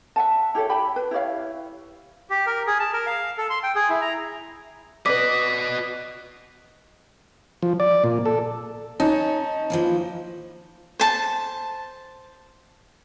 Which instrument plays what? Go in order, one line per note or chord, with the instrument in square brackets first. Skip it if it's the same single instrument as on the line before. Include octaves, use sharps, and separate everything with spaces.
[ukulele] E5 F#5 A5
E4 G4 A4 C#5
G4 G5 B5
B4
E4 G4 C#5 F5
[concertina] G4
A#4
G#4
A5
A#4
F5
A4
C6
G5
G#4
E4
A#5
[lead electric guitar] F#4 D#5 [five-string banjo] B4 D5 [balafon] D6 [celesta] B6
[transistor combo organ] F3
D5
A#2
A4
[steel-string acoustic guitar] C#4 [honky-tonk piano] D#4 [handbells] A5
[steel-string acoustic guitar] A#2 E3 F3
[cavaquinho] C5 A5